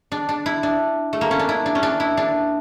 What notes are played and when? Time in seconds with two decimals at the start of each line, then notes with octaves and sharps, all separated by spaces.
0.12 D4
0.29 D4
0.46 E4
0.63 D4
1.13 A3
1.21 A#3
1.31 C#4
1.39 D4
1.49 E4
1.66 D4
1.75 C#4
1.83 D4
2.00 E4
2.17 D4